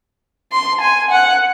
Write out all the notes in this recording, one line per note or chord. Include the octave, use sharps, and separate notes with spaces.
C6
G#5
F#5